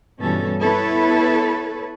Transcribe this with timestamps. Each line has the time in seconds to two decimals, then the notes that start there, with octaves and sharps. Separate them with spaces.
0.21 G2 B2 E3 G3 C#4 A4
0.61 B3 E4 A4 B4 C#5